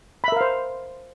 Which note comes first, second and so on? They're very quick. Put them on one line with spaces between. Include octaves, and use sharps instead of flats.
B5 E5 A#4 F5 C5